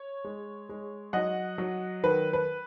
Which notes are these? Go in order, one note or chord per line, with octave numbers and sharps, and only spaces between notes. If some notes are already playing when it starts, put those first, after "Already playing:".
Already playing: C#5
G#3
G#3
F#3 D#5 F#5
F#3
D#3 B4
B4